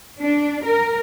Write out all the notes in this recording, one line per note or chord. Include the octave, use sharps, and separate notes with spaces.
D4
A#4